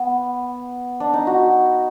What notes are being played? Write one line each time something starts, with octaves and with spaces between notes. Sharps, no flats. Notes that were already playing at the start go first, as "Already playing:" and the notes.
Already playing: B3
D4
D#4
F#4